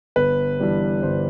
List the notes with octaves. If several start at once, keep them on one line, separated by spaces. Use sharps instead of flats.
G1 B4
G2 E3 G3
G1 C5